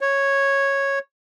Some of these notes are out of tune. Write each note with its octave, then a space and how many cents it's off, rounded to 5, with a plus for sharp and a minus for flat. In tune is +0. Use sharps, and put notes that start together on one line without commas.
C#5 -5